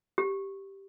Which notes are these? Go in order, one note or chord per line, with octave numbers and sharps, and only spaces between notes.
G4